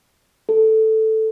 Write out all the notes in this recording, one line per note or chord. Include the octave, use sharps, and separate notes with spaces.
A4